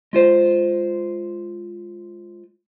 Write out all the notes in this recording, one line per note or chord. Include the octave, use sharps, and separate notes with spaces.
G#3 F4 C5